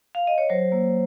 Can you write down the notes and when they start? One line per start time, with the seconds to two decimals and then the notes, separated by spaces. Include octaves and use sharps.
0.15 F5
0.27 D#5
0.38 C#5
0.49 F#3 C5
0.72 A#3